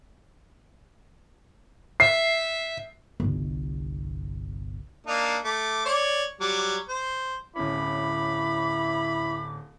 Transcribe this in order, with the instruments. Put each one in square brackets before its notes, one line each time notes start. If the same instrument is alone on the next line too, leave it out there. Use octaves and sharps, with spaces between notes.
[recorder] E5 [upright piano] C7
[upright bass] G1 C2
[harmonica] A#3 D4 D#4
A3 D6
C#5 D5
F#3 G3 D6
C5
[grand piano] D1 C#4 [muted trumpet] E4 [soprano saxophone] B5 [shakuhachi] D6